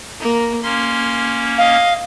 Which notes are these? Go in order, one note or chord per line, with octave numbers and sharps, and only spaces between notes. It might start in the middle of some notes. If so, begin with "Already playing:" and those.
A#3 A#4
A#3 C#4 C6
D#5 F5